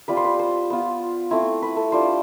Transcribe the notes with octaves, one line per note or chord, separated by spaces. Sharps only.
G3 C4 F4 B4
C5
B4
C5
B3 F4
A3 C4 E4
B4
A4
G3 D4 F4 C5